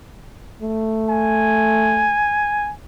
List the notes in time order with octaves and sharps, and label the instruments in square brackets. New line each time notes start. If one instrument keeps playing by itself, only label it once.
[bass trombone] A3
[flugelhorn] G#5